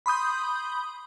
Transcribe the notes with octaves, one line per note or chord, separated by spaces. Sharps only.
B5 C6 D#6 G6